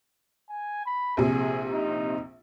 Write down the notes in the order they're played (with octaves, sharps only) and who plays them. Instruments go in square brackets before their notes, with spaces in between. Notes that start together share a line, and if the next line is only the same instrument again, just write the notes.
[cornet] G#5
B5
[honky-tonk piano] A#1 C3 [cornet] G#4
[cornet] D#4